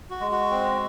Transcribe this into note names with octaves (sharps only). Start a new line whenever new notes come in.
F#4
G#3
F#4
C4